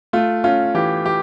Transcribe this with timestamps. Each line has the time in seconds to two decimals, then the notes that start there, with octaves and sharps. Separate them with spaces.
0.13 A3 F4
0.44 C#4 F4
0.74 E3 G4
1.06 E3 G4